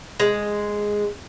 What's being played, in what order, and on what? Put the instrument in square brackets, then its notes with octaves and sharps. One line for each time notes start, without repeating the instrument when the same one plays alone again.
[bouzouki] G#3